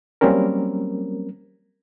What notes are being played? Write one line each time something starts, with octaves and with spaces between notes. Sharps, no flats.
F#3 G3 A#3 C4 C#4 A#4